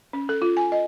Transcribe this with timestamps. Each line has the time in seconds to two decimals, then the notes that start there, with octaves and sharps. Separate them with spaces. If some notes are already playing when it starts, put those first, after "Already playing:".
0.13 C#4
0.29 A4
0.42 F4
0.57 G#5
0.72 D#5